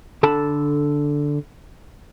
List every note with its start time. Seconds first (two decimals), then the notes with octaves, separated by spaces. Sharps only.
0.23 D3 A4 A5 B5